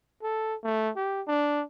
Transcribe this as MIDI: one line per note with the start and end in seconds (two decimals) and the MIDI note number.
0.23 0.55 69
0.64 0.90 57
0.96 1.22 67
1.27 1.63 62